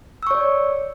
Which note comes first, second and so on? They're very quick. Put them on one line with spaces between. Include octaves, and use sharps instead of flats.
E6 C#6 C#5 D5